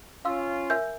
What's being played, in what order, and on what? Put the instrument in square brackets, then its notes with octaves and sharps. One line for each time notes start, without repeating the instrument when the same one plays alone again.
[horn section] C#4 F4 [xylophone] F5 C6 E6
[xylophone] A#4 E5 G#5 E6 G6